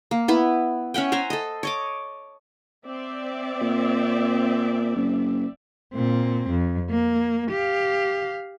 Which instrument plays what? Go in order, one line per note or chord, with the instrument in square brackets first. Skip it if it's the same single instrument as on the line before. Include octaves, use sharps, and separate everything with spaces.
[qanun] A#3
B3 E4 B4
C#4 E5 F#5 G5
C5 E5 G#5 A#5
A4 D#5
C#5 D#5 D6
[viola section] C4 D5 E5
[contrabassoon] A#2
F#1
[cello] A#2 C4
F2
A#3
G4 F5